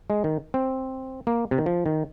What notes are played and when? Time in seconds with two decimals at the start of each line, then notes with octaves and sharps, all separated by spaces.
0.10 G#3
0.24 D#3
0.54 C4
1.27 A#3
1.51 C3
1.58 D#3
1.66 F3
1.86 D#3